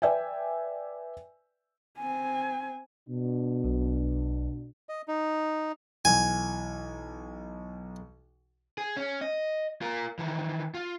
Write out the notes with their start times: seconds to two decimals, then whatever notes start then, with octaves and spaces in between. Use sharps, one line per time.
0.02 B4 D5 E5 G5 G#5
1.98 C4 G#5
3.09 B2 D4
3.64 B1
4.89 D#5
5.08 D#4
6.05 B1 E3 G#5
8.78 G#4
8.97 C#4
9.21 D#5
9.81 F4 A#4
10.19 D#3 E3
10.74 F4